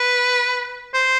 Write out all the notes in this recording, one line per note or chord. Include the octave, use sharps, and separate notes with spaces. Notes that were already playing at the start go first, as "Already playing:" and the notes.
Already playing: B4
C5